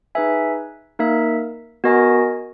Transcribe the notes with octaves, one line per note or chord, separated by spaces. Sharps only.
D#4 G#4 B4 E5 G#5
A#3 D#4 A#4 E5
B3 F#4 A#4 D#5 G#5